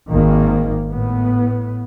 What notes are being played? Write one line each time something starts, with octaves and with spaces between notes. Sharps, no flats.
G#1 D#3 A#3
A2 B3